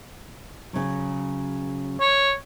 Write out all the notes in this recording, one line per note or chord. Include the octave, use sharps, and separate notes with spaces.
C#3 F#3
C#5